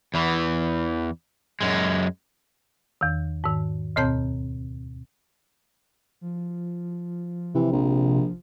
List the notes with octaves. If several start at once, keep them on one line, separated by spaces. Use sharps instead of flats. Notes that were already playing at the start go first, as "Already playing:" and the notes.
E2 E3
F#2 G#3
E2 D#3
G#2 D#3
D2 B2 C4 C#5 A5 G6
F3
C3 E3
A#1